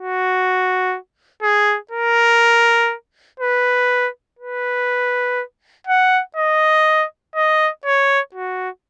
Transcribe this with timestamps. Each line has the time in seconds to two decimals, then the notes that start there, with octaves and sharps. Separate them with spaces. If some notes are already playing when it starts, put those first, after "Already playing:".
Already playing: F#4
1.43 G#4
1.91 A#4
3.40 B4
4.39 B4
5.87 F#5
6.36 D#5
7.35 D#5
7.85 C#5
8.34 F#4